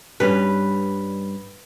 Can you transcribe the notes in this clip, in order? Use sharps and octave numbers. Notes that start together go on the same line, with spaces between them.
G2 G3 C#4 B4